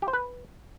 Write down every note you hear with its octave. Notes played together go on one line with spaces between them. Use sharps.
G4
C5
B4